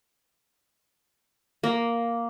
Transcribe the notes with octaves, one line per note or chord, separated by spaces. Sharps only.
A#3